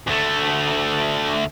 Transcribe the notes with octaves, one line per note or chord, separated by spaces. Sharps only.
D2 A3